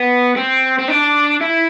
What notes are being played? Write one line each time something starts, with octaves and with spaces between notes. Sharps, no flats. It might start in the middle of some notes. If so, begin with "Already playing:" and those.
Already playing: B3
C4
C4
D4
E4